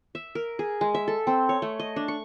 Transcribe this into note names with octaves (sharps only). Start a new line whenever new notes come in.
E5
A#4
G#4
G#3
E5
A4
C4
C#5
A3
D#5
D4
C#6